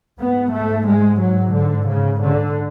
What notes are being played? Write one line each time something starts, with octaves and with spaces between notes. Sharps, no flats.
G#2 B3
A3
G#3
F#3
D3
C#3
D3